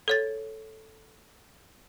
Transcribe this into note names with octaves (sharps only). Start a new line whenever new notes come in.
A4 C#5 A6